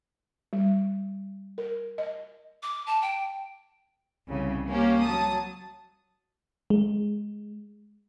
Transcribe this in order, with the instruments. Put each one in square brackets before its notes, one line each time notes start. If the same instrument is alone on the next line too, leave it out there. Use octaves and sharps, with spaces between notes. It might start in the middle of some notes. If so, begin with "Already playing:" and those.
[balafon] G3
A#4
D#5
[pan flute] D6
A5
G5
[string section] C2 C#3
A#3 C#4 G4
F#3 A5 D#6
[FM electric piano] G#3